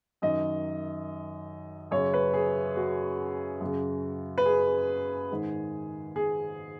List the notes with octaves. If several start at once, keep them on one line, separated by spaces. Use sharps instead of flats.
F#2 D#3 D#5
F#2 C#3 C#5
B4
G#4
F#4
F#2 C#3
B4
G#4
G#2 D#3
G#4